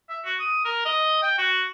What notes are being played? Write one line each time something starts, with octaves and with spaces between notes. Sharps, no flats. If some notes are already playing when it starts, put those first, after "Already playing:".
E5
F#4
D#6
A#4
D#5
G5
F#4